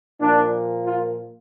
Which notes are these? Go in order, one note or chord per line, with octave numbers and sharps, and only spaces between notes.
A#2 F3 A#3 D4
F4